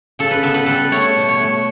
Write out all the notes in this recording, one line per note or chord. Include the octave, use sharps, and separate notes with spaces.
C#3 A4
B4
B3 A4
B4
G3 A4
A3 C#5
B2
C#5
A3